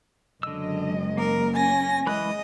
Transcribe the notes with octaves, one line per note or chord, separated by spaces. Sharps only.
F#1 D3 F#3 G#3 D#5 E6
A#3 A#4
C#4 G#5 A#6
E3 G#3 D#5 B5 F#6